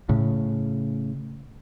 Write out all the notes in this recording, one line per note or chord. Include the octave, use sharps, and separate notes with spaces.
A2 C#3